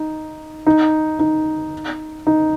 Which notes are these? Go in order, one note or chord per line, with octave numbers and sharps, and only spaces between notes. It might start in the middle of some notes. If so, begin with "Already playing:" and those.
Already playing: D#4
D#4
D#4
D#4